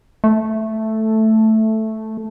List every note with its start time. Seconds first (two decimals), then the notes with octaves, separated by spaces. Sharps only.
0.24 A3